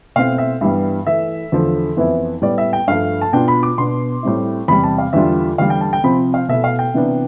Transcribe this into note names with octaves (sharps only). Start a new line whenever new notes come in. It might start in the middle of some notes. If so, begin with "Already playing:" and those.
B2 A3 C4 E4 F5
E5
G2 E3 G3 B3 E5
E3 A3 E4 E5
E2 D3 F3 A3
F2 E3 B3 E4
A2 G3 B3 D5
E5
G5
G2 F3 A3 F5
A5
B2 B3 D4 F4 G5
B5
D6
B2 B3 D4 C6
A2 G3 C4 E4
E2 C3 G3 B5
A5
F5
E2 D3 G3 D4 F4 E5
E2 D3 G3 F5
G5
A5
G5
C3 F3 C4 B5
F5
B2 A3 E4 E5
F5
G5
C3 E3 B3 D4